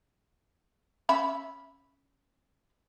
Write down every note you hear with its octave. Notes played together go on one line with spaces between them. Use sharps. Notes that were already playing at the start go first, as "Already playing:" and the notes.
C#4 E5 B5